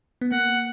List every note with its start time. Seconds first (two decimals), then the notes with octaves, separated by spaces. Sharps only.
0.21 B3
0.32 A#3 F#5